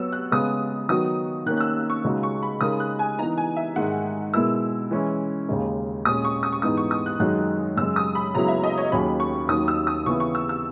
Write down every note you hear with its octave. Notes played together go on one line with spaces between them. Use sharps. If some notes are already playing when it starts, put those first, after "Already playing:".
Already playing: F#3 B3 F#4 C#5 E6
F#6
C#3 G#3 B3 D#6
D#3 F#3 B3 D#4 F#4 D#6
D#3 A#3 C#4 F#6
F#6
E6
C#6
C#2 C#3 G#3 D#4 F#4
C#6
B5
C#3 G#3 D#4 A#4 D#6
F#6
G#5
E3 B3 D#4 A#5
G#5
E5
G#2 D#3 G#3 D#4 F#5
B2 G#3 B3 E4 A#4 E6
E3 G#3 C#4 E4
D#2 C#3 G#3 D#4
A#2 G#3 C#4 D#6
C#6
D#6
C#6
G#2 E3 B3 D#4 G#4 D#6
C#6
D#6
F#6
F#2 D#3 G#3 D#4 F#4 F#6
F#2 C#3 G#3 E6
D#6
B5
C#2 C#3 F#3 B3 E4 A#5
E5
D#5
C#5
D#2 D#3 F#3 C#4 G#4 B5
C#6
D#2 D#3 F#3 D#6
E6
D#6
C#3 E3 B3 E4 C#6
C#6
E6
E6